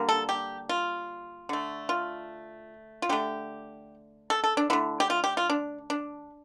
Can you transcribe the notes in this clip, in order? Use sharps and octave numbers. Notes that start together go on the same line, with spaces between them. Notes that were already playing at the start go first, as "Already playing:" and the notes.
Already playing: D3 G3 A#3
A4
G4
F4
D3 A3
F4
F4
D3 A3 G4
A4
A4
D4
D3 A3 E4
G4
F4
G4
F4
D4
D4